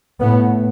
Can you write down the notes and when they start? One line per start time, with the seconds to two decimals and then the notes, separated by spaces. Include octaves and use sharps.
0.21 A2 B3